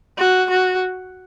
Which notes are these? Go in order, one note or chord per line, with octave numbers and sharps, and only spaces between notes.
F#4
F#4